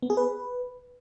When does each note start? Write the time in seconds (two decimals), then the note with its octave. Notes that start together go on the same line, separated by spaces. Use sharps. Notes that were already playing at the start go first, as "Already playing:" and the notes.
0.03 B3
0.10 G#4
0.17 B4